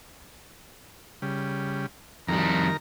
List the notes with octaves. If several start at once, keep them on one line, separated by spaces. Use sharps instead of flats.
C#3 G3
F2 D#3 G3 A#4 A#5